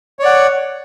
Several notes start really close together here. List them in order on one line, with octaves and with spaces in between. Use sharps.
C#5 D5 F#5